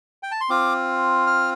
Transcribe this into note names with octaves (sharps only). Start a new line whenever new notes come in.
G5
A5
C6
C4 F4 D6
F6